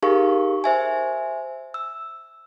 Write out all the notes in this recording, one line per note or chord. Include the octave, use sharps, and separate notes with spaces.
D#4 G4 G#4 A#4 F5 C#6
C5 E5 G#5
E6